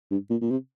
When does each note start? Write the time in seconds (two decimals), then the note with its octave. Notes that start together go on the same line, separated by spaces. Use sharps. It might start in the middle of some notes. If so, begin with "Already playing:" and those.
0.11 G2
0.30 A#2
0.41 A#2
0.51 C3